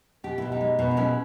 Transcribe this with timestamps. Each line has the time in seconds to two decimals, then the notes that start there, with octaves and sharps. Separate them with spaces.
0.24 B2 G4
0.38 B2 E4
0.52 D#4 G4
0.61 G#3
0.79 B2
0.91 D#4
0.97 G#3 C#4 E4